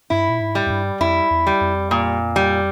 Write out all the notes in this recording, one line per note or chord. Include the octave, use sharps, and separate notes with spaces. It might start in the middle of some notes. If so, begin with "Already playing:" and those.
G2 E4
A#2
G#2
G3
F2
G2
F2 E4
E2
G3
F2
A#2
G3